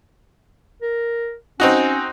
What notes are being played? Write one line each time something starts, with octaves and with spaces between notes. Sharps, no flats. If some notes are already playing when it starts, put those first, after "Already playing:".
A#4
C4 C#4 D#4 F#4